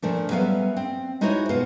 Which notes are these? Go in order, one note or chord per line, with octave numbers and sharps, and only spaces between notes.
A#2 F3 A3 D4
F#3 G3 B3 C#4 E5 F5
C4
G#3 D#4 E4 F#4 C5 C#5
B2 B3 F4 C5